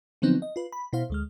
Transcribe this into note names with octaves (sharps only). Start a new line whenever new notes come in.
D3 F3 F#3 B3 C4 D#4
D#5
F4 B4
B5
B2 E4 C5 F5
D2 G#3 F6